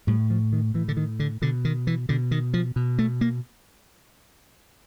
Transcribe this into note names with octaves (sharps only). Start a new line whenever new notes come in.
A2 G3
F3
D#3
A2 E3
D3
D#3
D3
B2 D3
D#3
E3
B2 D3
D#3
F3
B2
A3
A#3